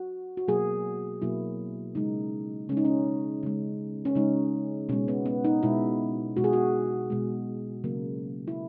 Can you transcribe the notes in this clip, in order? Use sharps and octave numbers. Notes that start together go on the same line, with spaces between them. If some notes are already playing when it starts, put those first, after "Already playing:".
Already playing: F#4
F#4
B2 F#3 A#3 G#4
B2 F#3 A#3 E4
C#3 G#3 D#4
C#3 G#3 C#4
D#4
C#4
C#3 G#3
C#4
C#3 G#3 D#4
B2 G#3 C#4
B3
B3
D#4
B2 G#3 E4
B2 G#3 F#4
G#4
F#4
B2 G#3
C#3 F#3 A#3
E4